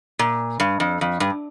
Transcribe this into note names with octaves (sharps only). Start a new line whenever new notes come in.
A#2
G2
F2
F2
G2